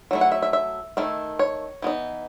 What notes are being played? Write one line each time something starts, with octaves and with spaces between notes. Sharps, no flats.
F#3 A3 E4
F#5
E5
E5
E5
D#3 A3 E4
C#5
E3 B3 D#4